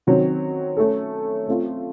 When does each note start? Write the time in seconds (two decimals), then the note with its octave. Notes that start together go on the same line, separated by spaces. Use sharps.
0.07 D#3 F#3 C4
0.77 A3 C#4 A4
1.48 A3 C4 F4